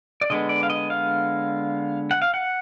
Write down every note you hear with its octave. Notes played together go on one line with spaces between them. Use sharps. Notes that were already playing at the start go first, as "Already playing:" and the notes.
D5
D3 G#3 B3 D#5
D5
F5
D#5
F5
F#5
F5
F#5